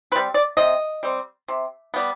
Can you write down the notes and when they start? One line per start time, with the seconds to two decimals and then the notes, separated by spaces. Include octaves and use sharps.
0.12 C4 B4
0.16 G3
0.34 D5
0.57 C3 D#5
1.03 G3 C4
1.48 C3
1.94 G3 B3